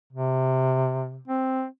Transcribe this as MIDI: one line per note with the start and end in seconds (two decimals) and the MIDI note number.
0.13 1.22 48
1.28 1.66 60